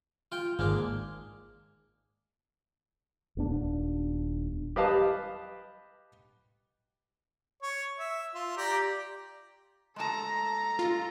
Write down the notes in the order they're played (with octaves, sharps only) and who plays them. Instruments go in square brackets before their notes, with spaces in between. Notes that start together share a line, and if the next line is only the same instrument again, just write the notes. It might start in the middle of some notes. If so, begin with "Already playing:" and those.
[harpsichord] F4 G5
[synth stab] G#1 [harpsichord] G#3 A#3 D4
[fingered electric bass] D#1 B3 D4
[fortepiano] G4 B4 D#5 F5 A5
[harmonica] C#5
E5
F4
G4 D5 A#5
[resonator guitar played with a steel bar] G#3 A5 [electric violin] A4 A#5
[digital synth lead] F4